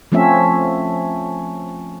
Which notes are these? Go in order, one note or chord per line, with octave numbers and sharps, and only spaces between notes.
F3 A3 C4 C#4 E5